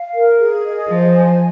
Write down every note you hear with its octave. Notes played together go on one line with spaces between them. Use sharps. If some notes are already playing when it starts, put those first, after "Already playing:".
Already playing: F5
A#4
G#4
D#5
F3 C5
G#5